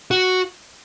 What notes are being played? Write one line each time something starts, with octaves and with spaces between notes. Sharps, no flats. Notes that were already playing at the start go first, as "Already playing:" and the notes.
F#4